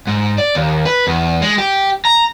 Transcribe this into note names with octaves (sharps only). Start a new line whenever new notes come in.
G#2
D5
D#2
B4
E2
G#3
G4
A#5